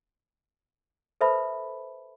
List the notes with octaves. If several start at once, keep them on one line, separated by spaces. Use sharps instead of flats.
A4 B4 C5 E5 A5 B5